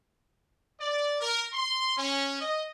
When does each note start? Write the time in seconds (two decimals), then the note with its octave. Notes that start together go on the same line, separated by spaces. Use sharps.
0.80 D5
1.21 A#4
1.53 C6
1.97 C#4
2.40 D#5